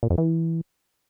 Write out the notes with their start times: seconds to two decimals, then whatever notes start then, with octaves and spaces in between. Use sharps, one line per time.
0.03 A#2
0.10 F2
0.18 E3